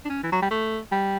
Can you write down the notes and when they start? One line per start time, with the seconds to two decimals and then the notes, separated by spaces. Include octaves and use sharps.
0.05 D4
0.09 C#4
0.23 E3
0.32 F#3
0.42 G3
0.51 A3
0.92 G3